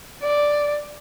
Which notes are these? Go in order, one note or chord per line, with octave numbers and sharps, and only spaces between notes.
D5